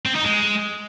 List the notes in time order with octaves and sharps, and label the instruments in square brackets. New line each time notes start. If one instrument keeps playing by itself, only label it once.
[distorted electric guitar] C4
D#4
G#3